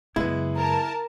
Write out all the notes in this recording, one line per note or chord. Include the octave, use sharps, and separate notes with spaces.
F#2 C#3 G#3 B3 E4
A#4 A5